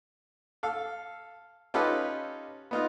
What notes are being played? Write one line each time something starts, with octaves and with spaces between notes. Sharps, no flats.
A4 F5
C#4 D#4 F4 G4 A4 B4
B3 D#4 F4